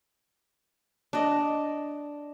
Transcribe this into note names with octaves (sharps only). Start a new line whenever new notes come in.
D4 D#5